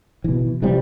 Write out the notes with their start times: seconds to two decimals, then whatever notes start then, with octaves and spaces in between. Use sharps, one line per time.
0.24 B2 E3
0.62 C3 E3 F3 G3